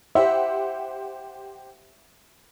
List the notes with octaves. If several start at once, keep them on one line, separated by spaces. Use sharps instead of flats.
G4 C5 E5 F#5